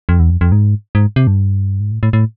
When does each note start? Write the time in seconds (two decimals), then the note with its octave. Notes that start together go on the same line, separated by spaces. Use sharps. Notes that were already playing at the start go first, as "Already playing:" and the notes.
0.09 F2
0.20 E2
0.30 F2
0.41 F2
0.52 G#2
0.95 G#2
1.16 C3
1.27 G2
1.80 G#2
1.92 A2
2.03 A2
2.13 A2